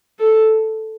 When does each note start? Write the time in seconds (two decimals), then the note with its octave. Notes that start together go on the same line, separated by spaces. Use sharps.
0.19 A4